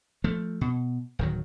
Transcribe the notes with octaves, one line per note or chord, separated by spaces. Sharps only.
F3 A3
B2
D1 D#3 F#3